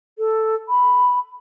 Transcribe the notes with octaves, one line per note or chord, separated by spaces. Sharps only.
A4
B5